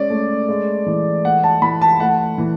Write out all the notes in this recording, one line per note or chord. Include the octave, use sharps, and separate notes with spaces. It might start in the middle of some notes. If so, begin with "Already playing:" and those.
Already playing: G#3 C#4 D5
A3
G#3
E3
A3 F#5
A5
E3 B5
A5
A3 F#5
E3